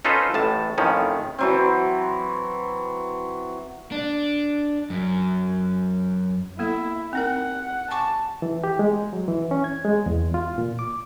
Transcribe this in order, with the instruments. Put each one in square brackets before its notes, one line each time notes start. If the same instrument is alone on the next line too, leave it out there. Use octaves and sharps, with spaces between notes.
[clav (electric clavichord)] C#4 D#4 F4 A4 B4 C5
A1 A2 A5
F2 A2 D#3 F3 C#4
[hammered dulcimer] E3 F#3 C4
[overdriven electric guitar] D4
F#2
[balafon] A#3 B3 A4 [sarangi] E4
[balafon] C4 D#4 A#4 [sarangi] F#5
[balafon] G#5 C#6 D6 [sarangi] A5
[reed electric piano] E3
G4
G#3
F#3
E3
C#4
G#6
G#3
E2
F4
A#2
D6